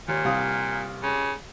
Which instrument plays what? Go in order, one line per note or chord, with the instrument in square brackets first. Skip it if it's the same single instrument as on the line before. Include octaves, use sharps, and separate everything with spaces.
[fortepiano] D#2 [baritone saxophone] A#2
[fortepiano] C2 F5 D#6
[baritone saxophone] C#3